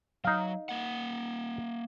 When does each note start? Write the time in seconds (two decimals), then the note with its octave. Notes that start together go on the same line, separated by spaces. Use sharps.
0.24 F#3 D#4 F5
0.69 A#3 F#5